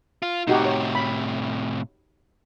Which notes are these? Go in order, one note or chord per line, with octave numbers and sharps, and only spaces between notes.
F4
A2 C3 D#4 F#4 G4
C#5
B5